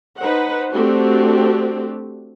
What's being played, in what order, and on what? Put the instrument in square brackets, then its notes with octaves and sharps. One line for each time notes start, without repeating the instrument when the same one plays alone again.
[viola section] D#4 B4 C5 F#5
A3 C4 D4 F#4 G4